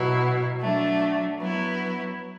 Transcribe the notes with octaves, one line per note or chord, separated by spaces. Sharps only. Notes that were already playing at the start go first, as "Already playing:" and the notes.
Already playing: B2 F#3 B3 E4
F#3 A3 D4
F#3 B3 E4